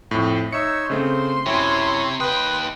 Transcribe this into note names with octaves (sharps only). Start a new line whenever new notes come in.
F2 A2
D#4 C#5 E5 E6 C#7
C#3 A3 C4 C5 C6
F#2 C3 E4 C#5
D#2 B4 G5 D#6